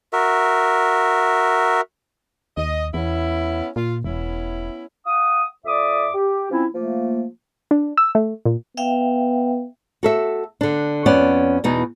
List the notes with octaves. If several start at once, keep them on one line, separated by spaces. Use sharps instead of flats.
F#4 A#4 E5
D#2 D#5
E2 B3 C#4 E4
A#2 F4
E1 B3 C#4 E4
F5 F#5 D#6
F2 D5 E5 D6 D#6
G4
F3 C4 C#4 E4
F3 A3 A#3
D4
E6
A3
A#2
B3 E5 F5 G5
F#4 A4 E5
D3 D4
F2 B3 C#4 D5 F#5
E2 B2 D#4